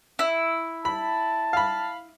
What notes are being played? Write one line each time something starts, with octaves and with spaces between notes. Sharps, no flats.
E4
A5 B5
F5 B5